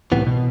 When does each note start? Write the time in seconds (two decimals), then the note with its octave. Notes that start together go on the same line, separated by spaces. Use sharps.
0.11 C2 A2 C3 E3 B3
0.27 B2